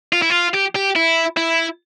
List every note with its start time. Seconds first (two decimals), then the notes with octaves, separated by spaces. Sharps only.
0.13 F4
0.22 E4
0.30 F4
0.54 G4
0.75 G4
0.96 E4
1.37 E4